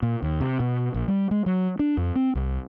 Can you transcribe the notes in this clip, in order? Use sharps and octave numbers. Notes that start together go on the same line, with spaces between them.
A#2
D#2
C3
B2
A#1
G3
G#3
F#3
D4
F2
C4
C2